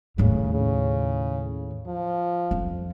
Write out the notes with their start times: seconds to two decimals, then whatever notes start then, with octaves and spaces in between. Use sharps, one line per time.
0.18 D#2 A2 C#3
0.54 C#3
1.86 F3
2.51 F2